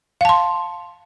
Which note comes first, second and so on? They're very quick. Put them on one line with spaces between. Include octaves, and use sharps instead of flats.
F5 A5 C6